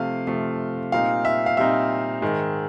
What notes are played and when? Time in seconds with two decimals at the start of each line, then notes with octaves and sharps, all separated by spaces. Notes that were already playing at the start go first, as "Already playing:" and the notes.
Already playing: C3 F3 A3 F5
0.27 C3 F3 A3
0.92 A#2 G3 C4 D#4 F5
1.25 E5
1.46 F5
1.57 A#2 G3 C4 D#4 E5
2.22 G#2 D#3 G#3